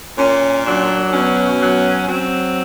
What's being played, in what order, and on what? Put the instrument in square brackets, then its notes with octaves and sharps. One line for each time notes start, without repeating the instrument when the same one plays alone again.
[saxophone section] A#2 C#4
F#3 D4
B2 C#4
F#3
F#3 C4